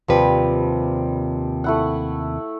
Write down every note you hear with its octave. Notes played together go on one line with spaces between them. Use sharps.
D#2 C3 F3 G3 B4
A3 E4 F#5